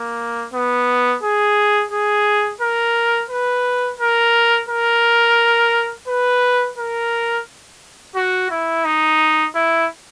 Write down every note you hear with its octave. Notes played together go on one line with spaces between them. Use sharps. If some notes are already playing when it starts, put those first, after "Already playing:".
Already playing: A#3
B3
G#4
G#4
A#4
B4
A#4
A#4
B4
A#4
F#4
E4
D#4
E4